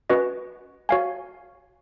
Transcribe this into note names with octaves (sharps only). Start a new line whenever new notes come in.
C#4 F#4 B4 D#5
F#4 C#5 F5 G#5